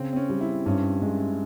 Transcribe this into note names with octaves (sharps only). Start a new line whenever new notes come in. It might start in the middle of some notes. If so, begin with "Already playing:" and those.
Already playing: C#3 C4
C4
C#4
G3
E4
G2 C#4
G#3